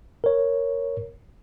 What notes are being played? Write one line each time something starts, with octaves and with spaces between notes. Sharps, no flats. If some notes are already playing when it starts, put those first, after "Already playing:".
A#4 C#5